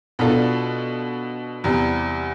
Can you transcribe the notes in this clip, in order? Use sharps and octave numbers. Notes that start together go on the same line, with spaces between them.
B2 B3 D4 F4 A4
E2 C3 G3